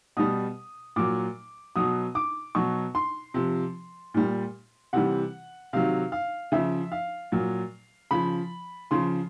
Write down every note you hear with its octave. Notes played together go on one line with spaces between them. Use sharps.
B2 G3 D#6
A#2 F#3 D6
B2 F#3 D#6
D6
B2 F#3 C#6
C6
C3 F3
A#2 G3
C3 E3 G3 F#5
C3 D#3 F#3 F5
F5
C#3 F3 E5
F5
A#2 F#3
C#3 F3 B5
C#3 F3 C6